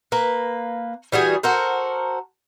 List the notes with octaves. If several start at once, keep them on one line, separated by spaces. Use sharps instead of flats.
A#3 B4
E3 G3 F#4 G#4
F#4 A4 A#4 C5